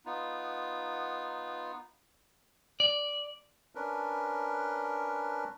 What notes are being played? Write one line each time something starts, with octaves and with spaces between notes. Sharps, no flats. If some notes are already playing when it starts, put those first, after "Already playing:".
B3 D#4 F4
D5
C#4 D4 A#4 B4